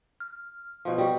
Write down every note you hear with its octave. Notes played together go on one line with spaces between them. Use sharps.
F6
B2 F3
G3 F#4